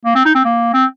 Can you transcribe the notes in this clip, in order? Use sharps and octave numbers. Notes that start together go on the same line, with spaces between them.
A#3
C4
D#4
C4
A#3
C4